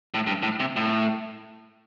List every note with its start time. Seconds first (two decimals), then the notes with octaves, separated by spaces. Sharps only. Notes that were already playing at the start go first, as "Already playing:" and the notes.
0.14 A2
0.27 G2
0.43 A2
0.60 C3
0.76 A2